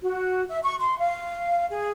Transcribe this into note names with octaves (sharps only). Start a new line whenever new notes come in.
F#4
E5
C#6
C6
F5
G#4